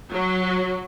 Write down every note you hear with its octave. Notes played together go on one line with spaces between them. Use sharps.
F#3